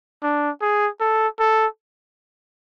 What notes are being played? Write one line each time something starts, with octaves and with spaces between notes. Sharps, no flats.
D4
G#4
A4
A4